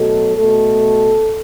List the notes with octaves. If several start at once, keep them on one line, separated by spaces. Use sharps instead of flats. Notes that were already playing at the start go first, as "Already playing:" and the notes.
Already playing: B2 F#3 A3 A4
B2 A3 A4